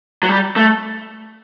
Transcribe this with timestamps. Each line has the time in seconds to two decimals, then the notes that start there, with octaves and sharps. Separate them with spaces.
0.23 F#3
0.29 G3
0.56 A3